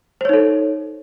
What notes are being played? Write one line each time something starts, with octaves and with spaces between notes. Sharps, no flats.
D#4 A4 C5 C#5